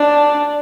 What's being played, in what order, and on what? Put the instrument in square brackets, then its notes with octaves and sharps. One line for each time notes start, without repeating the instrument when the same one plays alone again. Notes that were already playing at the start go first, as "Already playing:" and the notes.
Already playing: [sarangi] D4